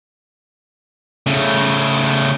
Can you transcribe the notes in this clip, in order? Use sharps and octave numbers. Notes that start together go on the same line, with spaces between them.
C#3 A3